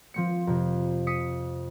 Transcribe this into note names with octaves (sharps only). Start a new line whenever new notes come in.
F3 C4 C#7
F2 C3
D#6 B6 C#7